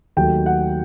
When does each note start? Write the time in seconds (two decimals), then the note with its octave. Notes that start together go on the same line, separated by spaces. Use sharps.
0.17 D#2 D#3 F#3 A3 G5
0.46 F#5